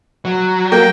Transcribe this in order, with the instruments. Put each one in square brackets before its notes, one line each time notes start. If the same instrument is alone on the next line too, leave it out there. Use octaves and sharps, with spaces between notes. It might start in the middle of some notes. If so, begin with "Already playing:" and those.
[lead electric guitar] F#3
[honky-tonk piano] A#3 [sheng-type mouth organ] G5